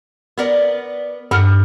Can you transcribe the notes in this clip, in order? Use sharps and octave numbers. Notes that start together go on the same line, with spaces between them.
B3 A#4 D5
G2 A4 A#4 F#5 F6